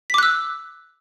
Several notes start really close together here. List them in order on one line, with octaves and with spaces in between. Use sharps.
B6 D6 F#6 E6